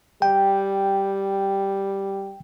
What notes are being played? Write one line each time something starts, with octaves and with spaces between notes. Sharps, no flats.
G3 G5